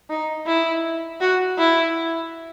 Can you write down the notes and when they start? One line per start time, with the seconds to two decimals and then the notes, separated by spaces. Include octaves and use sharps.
0.10 D#4
0.47 E4
1.21 F#4
1.58 E4